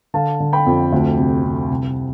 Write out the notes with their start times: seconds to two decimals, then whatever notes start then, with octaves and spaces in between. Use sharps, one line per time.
0.14 D3 F5 A5
0.40 D3
0.53 G5 B5
0.66 F2
0.92 D2
1.18 C3
1.44 C3
1.70 C2